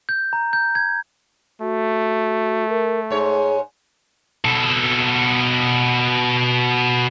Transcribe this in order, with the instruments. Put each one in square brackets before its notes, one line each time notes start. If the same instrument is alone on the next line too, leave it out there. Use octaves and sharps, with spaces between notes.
[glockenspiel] G6
A#5
G6
G#6
[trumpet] A3 [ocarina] F#4
[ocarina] A#4
[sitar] G#2 C#5 [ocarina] G#4
[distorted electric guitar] B2 A4